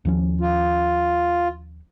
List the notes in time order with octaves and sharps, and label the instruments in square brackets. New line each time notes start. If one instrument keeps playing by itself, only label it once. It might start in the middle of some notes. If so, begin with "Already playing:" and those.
[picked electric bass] D#2 F3 C#4
[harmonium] F4